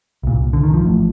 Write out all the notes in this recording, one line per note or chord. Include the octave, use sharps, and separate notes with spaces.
C2 A#2
D3
D#3
F3
A1 A2